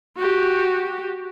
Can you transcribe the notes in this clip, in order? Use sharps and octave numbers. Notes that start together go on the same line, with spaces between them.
F#4 G4